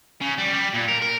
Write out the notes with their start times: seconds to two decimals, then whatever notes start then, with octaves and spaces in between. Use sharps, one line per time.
0.21 C#3
0.38 G3
0.53 G3
0.74 A#2
0.88 A#4
1.02 A#4